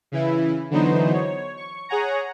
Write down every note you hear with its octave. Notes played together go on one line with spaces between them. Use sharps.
C#3 E3 E4
D3 E3 F#3 B3 D#4 C5
C#5
C#6
G#4 C#5 F#5 G#5 A#5